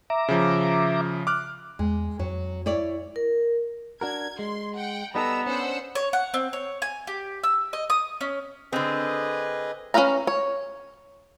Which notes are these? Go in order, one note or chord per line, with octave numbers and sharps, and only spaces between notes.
E5 A#5 D6
C#3 F3
D6 F6 F#6
E2 G#3
F2 F#3
E4 C#5 D5
A#4
D4 F#4 A#4 G#6
G#3 C6
F#5 G5
G3 B3 D#4 A4 A#5 E6
C#4 D4 C5 F#5 E6
C#5
F#5
C4
C#5
G#5
G4
E6
D#5
D#6
C#4
D3 C4 G#4 B4 D#5
C#4 G#4 B4 F5 A#5
C#5